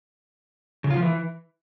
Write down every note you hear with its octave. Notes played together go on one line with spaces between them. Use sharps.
C#3
F4
F3
E3